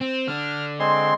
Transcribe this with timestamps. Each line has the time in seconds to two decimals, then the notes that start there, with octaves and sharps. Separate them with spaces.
0.01 C4
0.28 D3 D4 F6
0.80 G#3 C4 C6